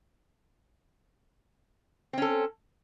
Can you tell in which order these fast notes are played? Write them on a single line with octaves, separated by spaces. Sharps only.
C4 C#4 A4